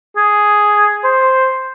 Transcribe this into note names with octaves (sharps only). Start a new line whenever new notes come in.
G#4
C5